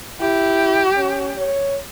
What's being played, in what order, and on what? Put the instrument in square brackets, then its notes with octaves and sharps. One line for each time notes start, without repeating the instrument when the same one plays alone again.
[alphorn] E4 [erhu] G4
[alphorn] C#4
C#5